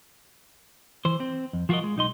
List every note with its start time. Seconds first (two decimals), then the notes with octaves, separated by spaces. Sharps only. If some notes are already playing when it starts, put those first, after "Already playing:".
1.05 E3 C5
1.20 C4
1.53 F2
1.69 F3 F4 F#4 G#4 A#4 D#5
1.84 G#3
1.96 B1 D#4 D#5 C6